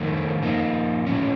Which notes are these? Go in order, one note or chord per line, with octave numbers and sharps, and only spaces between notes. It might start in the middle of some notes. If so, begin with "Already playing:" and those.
Already playing: F2 D#3 A3
F3 A#3 D#4
A2 F3 A3 C#4